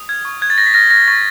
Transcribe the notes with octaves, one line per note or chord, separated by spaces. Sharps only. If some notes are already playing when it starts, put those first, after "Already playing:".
Already playing: D#6
F6 G#6
C#6
F#6 G#6
A6
F#6 A#6
B6
F6 A#6
F6 A#6
C#6 A6